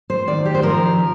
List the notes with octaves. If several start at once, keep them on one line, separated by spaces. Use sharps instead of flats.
C5
D#3 D5
G4
C5
F3 A#4
F3